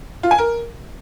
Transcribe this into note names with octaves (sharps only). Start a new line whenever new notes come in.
F4
G#5
A#4